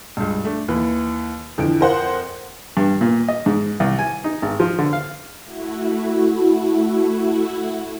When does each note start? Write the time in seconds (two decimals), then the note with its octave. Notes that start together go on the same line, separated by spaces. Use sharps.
0.17 C#2 G2
0.45 A3 D4
0.68 D#2 E3 B4
1.58 F2 D3 E3 F3 D7
1.81 A#4 C5 F#5
2.77 G2
3.01 A#2
3.28 D#5
3.46 G#2
3.80 C2
3.99 G#5
4.24 D#4
4.42 G#1
4.60 F3
4.78 D3
4.93 F5
5.44 A3 E4 F#4